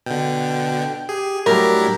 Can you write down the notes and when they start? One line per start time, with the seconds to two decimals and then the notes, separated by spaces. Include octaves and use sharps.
0.06 B2 D3 G5
1.09 G4 G#4
1.46 A2 F#3 G3 D4 E4 G4 A#4